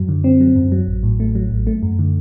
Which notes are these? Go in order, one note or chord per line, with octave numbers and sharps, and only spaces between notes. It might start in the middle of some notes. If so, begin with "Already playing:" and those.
Already playing: F#2 F#3
D3
C4
F#3
F#2
F#3
A1
A2
A3
F#3
A1
A3
F#2
D3